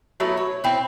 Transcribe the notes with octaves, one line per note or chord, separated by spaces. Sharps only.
F#3 A3 B3 E4
C#5
C4 E4